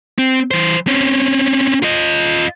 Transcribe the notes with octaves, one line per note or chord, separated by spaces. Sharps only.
C4
E3 C5
C4 C#4
F4 D#5